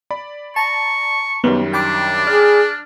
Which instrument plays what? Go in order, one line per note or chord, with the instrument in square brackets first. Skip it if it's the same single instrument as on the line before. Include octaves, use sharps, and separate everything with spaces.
[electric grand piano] D5 B5
[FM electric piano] A5 A#5 [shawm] C#6
[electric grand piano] F#2 D#3 G3 [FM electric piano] B3
[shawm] D4 [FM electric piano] G5 B5 D6
[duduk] G#4 [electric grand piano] D5 F6